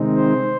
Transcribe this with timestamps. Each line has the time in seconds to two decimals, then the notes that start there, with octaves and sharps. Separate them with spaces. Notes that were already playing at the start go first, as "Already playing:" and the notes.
Already playing: C3 D#3 G#3 C4 D#4
0.14 C5